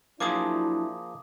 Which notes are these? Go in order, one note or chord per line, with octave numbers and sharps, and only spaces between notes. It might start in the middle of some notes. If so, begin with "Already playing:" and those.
F3 F#3 A#3 D4 E4 G#4 D6 D#6